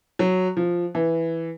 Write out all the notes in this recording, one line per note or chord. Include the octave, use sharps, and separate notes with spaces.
F#3
F3
E3